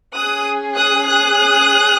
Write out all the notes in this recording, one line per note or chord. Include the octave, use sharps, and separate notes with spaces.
C#4 G#4 D#6 F#6
D#6 F#6
D#6 F#6